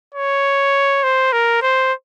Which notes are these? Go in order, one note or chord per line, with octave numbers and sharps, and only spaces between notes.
C#5
C5
A#4
C5